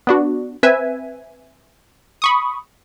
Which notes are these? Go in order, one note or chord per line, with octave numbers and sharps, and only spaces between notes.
B3 D4 F#4
C4 B4 E5 G#5
B5 C#6 D#6